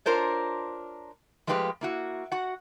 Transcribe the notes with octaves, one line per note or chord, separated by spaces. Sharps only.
D4 F4 A#4 C5 C#5
F3 G#3 A3 G4 B4 F5
A#3 E4 F#4
F#4 F#5